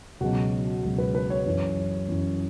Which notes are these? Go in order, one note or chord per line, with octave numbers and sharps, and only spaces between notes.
C#2 B2 F#3 F#4
C#2 B2 F#3
B4
B4
C#5
F#2 E3 C#4
F#2 E3 C#4